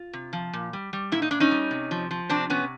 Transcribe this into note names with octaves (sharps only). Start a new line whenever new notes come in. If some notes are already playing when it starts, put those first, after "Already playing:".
Already playing: F4
C3
F3
A#2
G3
G3
A#2 E4
D#4
A#2 D4
C#4 D#4
G3
C3
F3
F3
C3 C4 D4
C3 B3 C#4